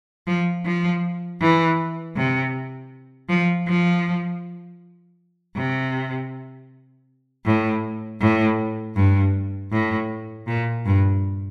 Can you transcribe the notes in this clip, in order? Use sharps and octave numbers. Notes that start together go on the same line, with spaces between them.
F3
F3
E3
C3
F3
F3
C3
A2
A2
G2
A2
A#2
G2